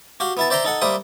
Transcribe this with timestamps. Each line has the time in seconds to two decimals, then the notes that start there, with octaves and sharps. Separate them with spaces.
0.20 F#4 G4 F5
0.37 B3 E4 A5
0.50 C5 D5 E5 G5 A#5 C6
0.65 D#4 A4 F#5
0.81 G3 A#3 C5 E5 D#6